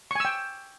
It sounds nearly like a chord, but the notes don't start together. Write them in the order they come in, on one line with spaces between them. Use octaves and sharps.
C#6 G#5 E6 G5